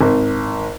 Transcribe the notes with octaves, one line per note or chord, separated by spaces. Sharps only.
G#1